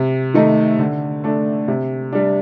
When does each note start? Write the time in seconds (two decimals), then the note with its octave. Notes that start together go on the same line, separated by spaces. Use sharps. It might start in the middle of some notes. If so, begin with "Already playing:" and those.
Already playing: C3
0.34 D#3 A3 D#4
0.79 D3
1.24 A3 D4
1.68 C3
2.13 G3 D4